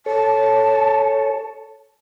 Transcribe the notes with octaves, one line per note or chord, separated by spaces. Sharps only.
A4 C#5 A5